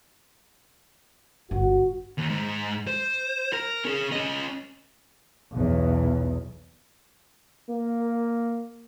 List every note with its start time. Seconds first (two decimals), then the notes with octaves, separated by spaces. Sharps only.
1.51 G1 F#4
2.18 D#2
2.30 G#2
2.87 C5
3.53 A#4
3.85 C#4 G#4
4.12 C#4 D#5
5.53 B1 E2
7.70 A#3